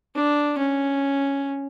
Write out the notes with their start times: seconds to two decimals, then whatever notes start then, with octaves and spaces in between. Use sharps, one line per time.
0.15 D4
0.58 C#4